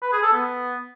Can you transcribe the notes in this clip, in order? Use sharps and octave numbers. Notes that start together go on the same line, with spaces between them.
B4
G#4
A4
B3